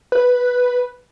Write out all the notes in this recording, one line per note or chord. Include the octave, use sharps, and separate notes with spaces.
B4